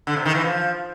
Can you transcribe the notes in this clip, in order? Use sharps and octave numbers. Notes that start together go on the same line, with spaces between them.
D3
C3
D#3
E3
F3